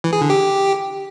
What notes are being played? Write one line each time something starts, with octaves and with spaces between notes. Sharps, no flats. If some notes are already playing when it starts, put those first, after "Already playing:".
E3
G#4
D3
G4